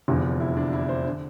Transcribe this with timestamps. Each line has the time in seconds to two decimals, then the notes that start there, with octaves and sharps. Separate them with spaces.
0.08 F1 E2 D3 F3 E4
0.40 E4
0.57 D4
0.73 E4
0.89 C5
1.07 D3